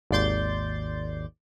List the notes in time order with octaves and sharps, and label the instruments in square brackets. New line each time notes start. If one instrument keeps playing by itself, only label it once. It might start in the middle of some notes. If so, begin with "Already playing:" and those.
[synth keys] G#1 D#2 D5 C6 G6 A6